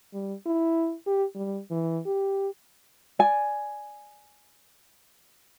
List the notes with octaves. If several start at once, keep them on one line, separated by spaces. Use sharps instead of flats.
G3
E4
G4
G3
E3
G4
D5 G#5